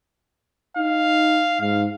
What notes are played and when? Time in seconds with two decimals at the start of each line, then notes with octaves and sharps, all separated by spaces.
0.77 D#4 F5
1.61 G#2 F5